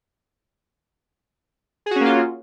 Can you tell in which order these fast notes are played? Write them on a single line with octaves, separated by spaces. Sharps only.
G#4 F#4 C#4 A#3 F4